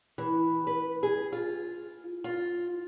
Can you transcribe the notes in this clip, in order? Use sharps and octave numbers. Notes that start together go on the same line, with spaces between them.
E3
B4
G#4
F4
F4